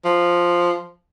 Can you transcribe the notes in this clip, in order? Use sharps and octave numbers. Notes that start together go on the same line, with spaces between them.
F3